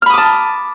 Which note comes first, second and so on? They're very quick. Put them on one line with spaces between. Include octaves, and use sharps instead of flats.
F6 B5 D#6 D6 A5